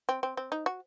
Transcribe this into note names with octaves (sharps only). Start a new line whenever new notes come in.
C4
C4
C4
D#4
F#4